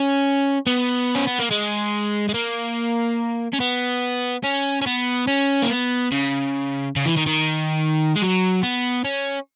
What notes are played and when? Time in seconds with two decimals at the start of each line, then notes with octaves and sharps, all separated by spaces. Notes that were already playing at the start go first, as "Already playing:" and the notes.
Already playing: C#4
0.67 B3
1.15 C#4
1.27 B3
1.39 A#3
1.51 G#3
2.29 G#3
2.34 A#3
3.53 C#4
3.60 B3
4.44 C#4
4.82 C#4
4.87 B3
5.27 C#4
5.62 A#3
5.70 B3
6.12 C#3
6.96 C#3
7.06 E3
7.17 D#3
7.27 D#3
8.15 G#3
8.22 F#3
8.63 B3
9.05 C#4